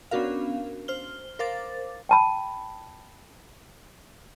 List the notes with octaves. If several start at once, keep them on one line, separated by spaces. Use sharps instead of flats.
B3 C#4 D4 F#4 A#4 F5
C5 F6 G7
A#4 C5 F5 D6 A6
G5 A5 B5